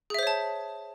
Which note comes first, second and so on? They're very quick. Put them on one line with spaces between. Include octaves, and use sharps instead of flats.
G#4 E5 C5 C#5 A5